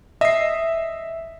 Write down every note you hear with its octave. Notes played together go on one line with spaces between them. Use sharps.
D#5 E5 C7